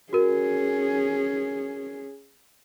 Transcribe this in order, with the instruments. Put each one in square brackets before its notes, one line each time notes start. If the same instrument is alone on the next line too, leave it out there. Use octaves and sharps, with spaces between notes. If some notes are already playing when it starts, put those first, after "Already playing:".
[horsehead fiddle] C#4 G#4 [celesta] F#4 A#4